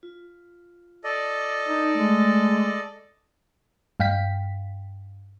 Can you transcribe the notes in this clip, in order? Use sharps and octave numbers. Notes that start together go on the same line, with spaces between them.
F4
A4 D5 D#5
D#4
G#3 A3
G2 F5 G5 B6